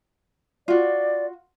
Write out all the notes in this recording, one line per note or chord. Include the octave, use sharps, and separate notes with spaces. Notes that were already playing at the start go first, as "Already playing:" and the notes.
F4 F#4 D5